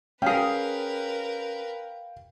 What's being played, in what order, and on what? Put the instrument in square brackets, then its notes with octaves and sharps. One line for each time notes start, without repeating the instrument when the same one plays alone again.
[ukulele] C#4 G#4 [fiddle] A#4 B4 [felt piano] F5 G5